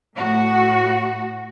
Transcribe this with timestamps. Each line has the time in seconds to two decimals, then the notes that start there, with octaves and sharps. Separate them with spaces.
0.15 A2 F#4